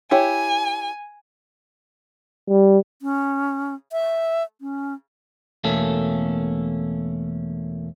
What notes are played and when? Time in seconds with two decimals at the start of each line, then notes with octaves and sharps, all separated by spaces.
0.11 E4 G4 C#5 G#5
2.49 G3
3.02 C#4
3.92 E5
4.61 C#4
5.64 E2 B2 A3 A#3 C#4 A4